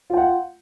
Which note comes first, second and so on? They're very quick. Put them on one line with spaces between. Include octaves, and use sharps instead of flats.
F4 G5 F#5